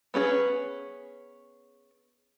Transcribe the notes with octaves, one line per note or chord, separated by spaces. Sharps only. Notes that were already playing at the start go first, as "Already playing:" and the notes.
B3 C#4 G#4 B4